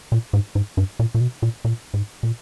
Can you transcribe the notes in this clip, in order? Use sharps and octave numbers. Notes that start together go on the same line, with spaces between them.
A#2
G#2
G#2
G2
A#2
A#2
B2
A#2
A#2
G#2
A#2